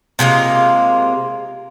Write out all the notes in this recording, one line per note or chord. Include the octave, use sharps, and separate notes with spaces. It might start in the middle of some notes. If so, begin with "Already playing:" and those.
C3 G#3 A#3 F4